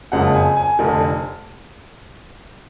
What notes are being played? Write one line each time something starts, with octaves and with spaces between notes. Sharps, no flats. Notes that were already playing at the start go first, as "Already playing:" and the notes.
F#1 F2 C#3 G#3 F#5
G#5
G#5
F1 F2 D3